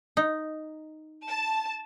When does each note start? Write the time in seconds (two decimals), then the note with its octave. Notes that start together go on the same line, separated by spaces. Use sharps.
0.17 D#4
1.28 A5